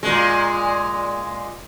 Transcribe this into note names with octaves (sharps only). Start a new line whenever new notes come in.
A#2 G#3